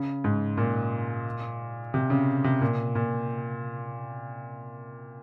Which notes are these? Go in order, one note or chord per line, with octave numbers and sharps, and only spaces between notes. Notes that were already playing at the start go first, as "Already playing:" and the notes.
Already playing: C#3
G#2
A#2
C3
C#3
C3
A#2
A#2